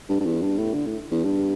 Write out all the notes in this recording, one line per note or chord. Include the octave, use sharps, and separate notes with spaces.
G2
G2
E2
G2
A2
D3
A2
E2
G2